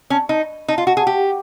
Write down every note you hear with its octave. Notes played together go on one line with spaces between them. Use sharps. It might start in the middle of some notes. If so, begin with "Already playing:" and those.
C#4
D#4
D#4
F4
F#4
G#4
G4